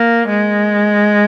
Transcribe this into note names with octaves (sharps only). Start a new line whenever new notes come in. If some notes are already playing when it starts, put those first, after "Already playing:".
Already playing: A#3
G#3